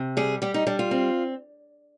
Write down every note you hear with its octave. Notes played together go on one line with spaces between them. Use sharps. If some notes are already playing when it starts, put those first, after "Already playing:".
Already playing: C3
G3 G#4
G3 G4
D#4
G3 D4
F4
C4